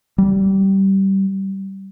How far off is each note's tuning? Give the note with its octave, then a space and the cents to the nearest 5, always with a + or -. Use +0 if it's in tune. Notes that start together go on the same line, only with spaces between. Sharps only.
G3 -20